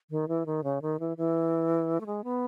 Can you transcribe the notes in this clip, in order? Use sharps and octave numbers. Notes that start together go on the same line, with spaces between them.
D#3
E3
D#3
C#3
D#3
E3
E3
A3
G#3
B3